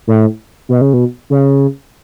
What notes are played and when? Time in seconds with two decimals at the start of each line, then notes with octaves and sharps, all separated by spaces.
0.07 A2
0.69 B2
0.81 C#3
0.93 B2
1.30 C#3